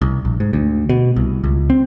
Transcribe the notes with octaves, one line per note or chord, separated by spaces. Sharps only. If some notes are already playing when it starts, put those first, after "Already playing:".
C2
A#1
G#2
D2
B2
C2
C#2
C4